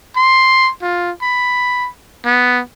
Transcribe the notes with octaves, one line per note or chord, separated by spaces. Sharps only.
C6
F4
B5
B3